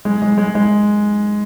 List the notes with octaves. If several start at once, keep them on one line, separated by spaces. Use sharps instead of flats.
G#3
G#3
G#3
G#3